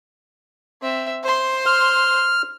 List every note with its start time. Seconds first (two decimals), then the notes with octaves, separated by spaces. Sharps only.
0.82 C4 E5
1.23 C5 C6
1.66 F6